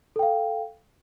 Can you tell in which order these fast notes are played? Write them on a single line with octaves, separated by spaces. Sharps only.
A4 G5 F5